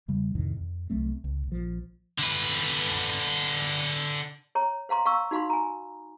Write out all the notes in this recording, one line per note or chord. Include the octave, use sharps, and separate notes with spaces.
E2 C#3 G3 G#3
F2 A2 C3 D#3
F2
C2 F#3 A3 C4
C#2
A#1 F3
D3 B4
C#5 A#5
C5 F5 A#5 C6
F5 A#5 C#6 E6
D#4 F#4 F5 B5 C6
G#5 A#5